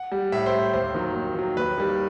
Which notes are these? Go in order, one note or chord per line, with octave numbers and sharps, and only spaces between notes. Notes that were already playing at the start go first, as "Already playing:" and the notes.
Already playing: F#5
G3
A2 E5
C5
G3
D#2 C5
D#3 F#3
D#2
D#3 F#3
D#2 B4
D#3 G3